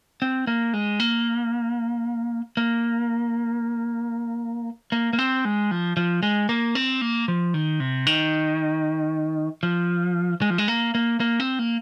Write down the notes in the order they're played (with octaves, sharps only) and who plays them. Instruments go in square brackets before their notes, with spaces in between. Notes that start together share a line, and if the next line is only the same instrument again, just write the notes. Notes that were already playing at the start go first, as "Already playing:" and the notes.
[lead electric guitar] C4
A#3
G#3
A#3
A#3
A#3
A#3
C4
G#3
F3
F3
G#3
A#3
C4
A#3
F3
D#3
C3
D#3
F3
G#3
F3
G#3
A#3
A#3
A#3
C4
A#3